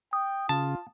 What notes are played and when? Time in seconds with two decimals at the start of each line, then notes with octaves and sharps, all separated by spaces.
0.13 G5 D#6
0.49 C#3 F4 A5